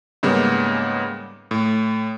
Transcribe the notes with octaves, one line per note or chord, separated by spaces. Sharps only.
G#2 C#3 G3 A#3 B3
A2